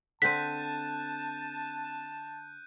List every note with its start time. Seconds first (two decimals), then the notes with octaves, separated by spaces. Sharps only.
0.22 D3 C4 A5 F#6 G6 B6 D#7